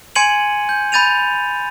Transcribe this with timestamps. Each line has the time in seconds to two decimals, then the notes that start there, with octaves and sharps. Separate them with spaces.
0.15 G#5 C6 G#6 C#7 D#7 F#7
0.69 G6
0.92 B5 G6 A6 D#7 F7